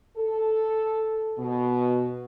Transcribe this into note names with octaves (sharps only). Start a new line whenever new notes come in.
A4
B2